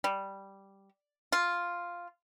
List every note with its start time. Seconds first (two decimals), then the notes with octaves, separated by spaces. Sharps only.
0.04 G3
1.32 F4